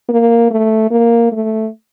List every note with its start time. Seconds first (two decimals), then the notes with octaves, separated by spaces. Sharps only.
0.09 A#3
0.51 A3
0.91 A#3
1.32 A3